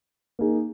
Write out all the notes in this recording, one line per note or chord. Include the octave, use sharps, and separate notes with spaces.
A#3 D#4 G#4